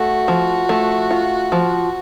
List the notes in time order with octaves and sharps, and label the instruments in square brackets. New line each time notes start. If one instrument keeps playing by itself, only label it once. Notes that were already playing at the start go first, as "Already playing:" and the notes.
Already playing: [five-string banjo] A3 [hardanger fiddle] F#4
[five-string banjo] F3
A3
F4
F3